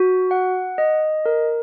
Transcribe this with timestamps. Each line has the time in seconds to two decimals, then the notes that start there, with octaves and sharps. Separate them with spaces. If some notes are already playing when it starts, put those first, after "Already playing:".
Already playing: F#4
0.31 F#5
0.78 D#5
1.26 A#4